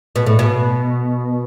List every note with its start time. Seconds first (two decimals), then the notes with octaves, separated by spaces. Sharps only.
0.16 B2
0.26 A2
0.39 B2